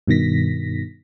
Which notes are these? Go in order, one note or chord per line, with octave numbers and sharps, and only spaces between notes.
G2 B2 D#3 A#6 B6